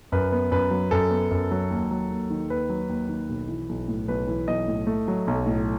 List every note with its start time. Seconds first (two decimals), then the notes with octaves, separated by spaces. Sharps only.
0.12 F#2 B4
0.32 B3
0.51 F#2 B4
0.71 F#3
0.91 F#2 A4
1.10 B3
1.31 F#2
1.51 F#3
1.70 D#2
1.91 F#3
2.10 D#2
2.30 D#3
2.50 D#2 B4
2.70 F#3
2.89 D#2
3.09 D#3
3.29 B1
3.48 E3
3.69 B1
3.88 A2
4.08 B1 B4
4.27 E3
4.48 B1 D#5
4.68 A2
4.87 A3
5.08 F#3
5.27 B1
5.46 A2